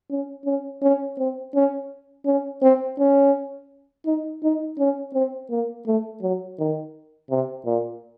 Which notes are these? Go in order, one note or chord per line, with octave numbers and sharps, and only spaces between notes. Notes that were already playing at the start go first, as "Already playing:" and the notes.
C#4
C#4
C#4
C4
C#4
C#4
C4
C#4
D#4
D#4
C#4
C4
A#3
A3
F#3
D#3
C3
A#2